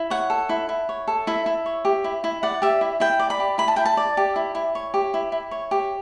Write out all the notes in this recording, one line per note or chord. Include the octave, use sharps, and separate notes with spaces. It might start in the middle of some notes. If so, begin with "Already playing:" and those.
Already playing: E4
C#5 F#5
A4
E4
E4
C#5
A4
E4 E5
E4
C#5
G4
E4
E4
D5 F#5
G4 E5
E4
E4 G5
D5
B5
G4
E4 B5
A5
E4 G5
A5
D5
G4
E4
E4
C#5
G4
E4
E4
C#5
G4